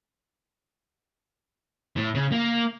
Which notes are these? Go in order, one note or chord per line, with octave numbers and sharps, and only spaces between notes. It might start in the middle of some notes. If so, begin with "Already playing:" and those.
A2
C#3
A#3